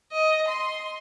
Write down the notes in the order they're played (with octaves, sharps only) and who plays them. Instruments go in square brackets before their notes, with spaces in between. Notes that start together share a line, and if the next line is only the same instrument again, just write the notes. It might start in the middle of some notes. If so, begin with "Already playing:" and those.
[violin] D#5
C6